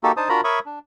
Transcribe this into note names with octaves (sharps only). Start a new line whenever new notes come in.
A#3 D#4 F#4 G4 A4
D4 D#4 C5 A5 D#6
D4 F4 F#4 A#4 A#5 B5
A#4 C#5 E5 B5 C#6 D#6
D4